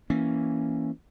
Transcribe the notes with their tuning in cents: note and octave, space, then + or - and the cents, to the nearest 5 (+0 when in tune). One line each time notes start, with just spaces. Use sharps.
E3 -5 A#3 +0 C#4 +0